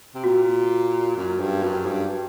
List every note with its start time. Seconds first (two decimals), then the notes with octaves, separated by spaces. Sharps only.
0.15 C3
0.24 A#2 F#4
1.17 F#2
1.40 G2
1.63 F#2
1.86 G2